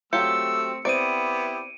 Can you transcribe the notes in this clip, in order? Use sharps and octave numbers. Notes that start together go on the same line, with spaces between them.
F#3 A3 C4 F4 G4 E6 C#7
B3 C4 E4 G4 D5 D7 D#7